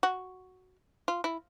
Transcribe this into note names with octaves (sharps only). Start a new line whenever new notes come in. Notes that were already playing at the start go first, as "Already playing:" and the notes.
F#4
F4
E4